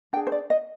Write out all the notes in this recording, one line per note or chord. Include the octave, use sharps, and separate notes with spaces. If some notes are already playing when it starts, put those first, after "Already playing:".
D4 G#4 G5
C5
D5
D#5